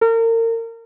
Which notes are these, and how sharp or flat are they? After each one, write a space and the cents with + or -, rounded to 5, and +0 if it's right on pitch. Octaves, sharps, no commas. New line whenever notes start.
A#4 -35